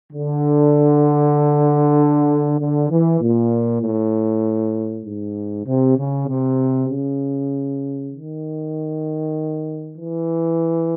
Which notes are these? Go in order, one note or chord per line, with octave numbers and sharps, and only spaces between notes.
D3
D3
E3
A#2
A2
G#2
C3
C#3
C3
C#3
D#3
E3